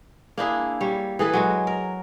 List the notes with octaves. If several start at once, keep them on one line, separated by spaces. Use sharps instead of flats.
A#3 D4 E4 G#4
G3 C#5
E3 G#4 A4 B4
F#3 G#3 F#4
A#4